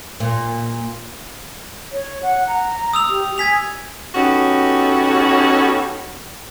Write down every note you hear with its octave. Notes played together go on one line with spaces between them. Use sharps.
A#2
C#5
F#5
A#5
D#6 E6 F7
G4
G#5 G#6 B6 F7
B3 C#4 D#4 F#4 G4 A4